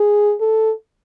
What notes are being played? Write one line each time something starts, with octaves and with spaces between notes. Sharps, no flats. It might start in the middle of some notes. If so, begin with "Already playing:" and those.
Already playing: G#4
A4